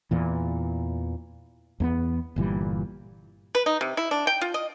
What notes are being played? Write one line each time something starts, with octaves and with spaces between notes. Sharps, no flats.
E2 A#2 E3
E2 A#3 B3
G1 A#2 E3 G3
B4
D#4
C3
E4
D4
G5
F4
D#5